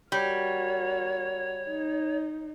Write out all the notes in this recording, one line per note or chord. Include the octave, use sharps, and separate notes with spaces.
G3 F#4 A#4 C#5
D#4